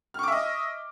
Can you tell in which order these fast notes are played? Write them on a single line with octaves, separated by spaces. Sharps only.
F6 C#6 D6 E5 D#5